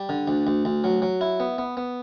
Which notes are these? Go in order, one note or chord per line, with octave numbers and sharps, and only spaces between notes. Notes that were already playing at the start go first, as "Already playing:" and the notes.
Already playing: G3
D3
D2
D2
D2
F#3
F#3
E4
B3
B3
B3